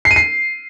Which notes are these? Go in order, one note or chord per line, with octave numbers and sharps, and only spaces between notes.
C7
D#7
C7